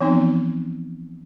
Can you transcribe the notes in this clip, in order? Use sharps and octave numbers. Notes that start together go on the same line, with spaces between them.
E3 F3 B3 C4 D#4